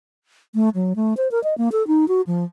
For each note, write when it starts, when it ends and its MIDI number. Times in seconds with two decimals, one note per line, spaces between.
0.55 0.69 57
0.75 0.93 54
0.96 1.14 57
1.17 1.31 72
1.31 1.42 70
1.44 1.57 75
1.58 1.69 58
1.72 1.86 69
1.87 2.08 63
2.08 2.21 66
2.27 2.44 53